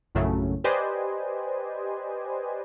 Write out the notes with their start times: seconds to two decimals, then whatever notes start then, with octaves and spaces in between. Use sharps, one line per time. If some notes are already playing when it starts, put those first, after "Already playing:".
0.15 A#1 F#2 A2 C#3 F#3 A3
0.64 G4 B4 C5 D5 D#5 G#5